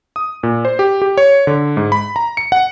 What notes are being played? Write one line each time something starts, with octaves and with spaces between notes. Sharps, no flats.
D#6
A#2
C5
G4
G4
C#5
D3
G#2
B5
A#5
C#7
F#5